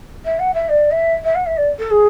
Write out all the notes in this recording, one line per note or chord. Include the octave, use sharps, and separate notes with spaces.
E5
F#5
E5
D5
E5
E5
F#5
E5
D5
A4
G#4